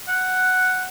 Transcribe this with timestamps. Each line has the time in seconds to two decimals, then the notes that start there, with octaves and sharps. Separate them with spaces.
0.08 F#5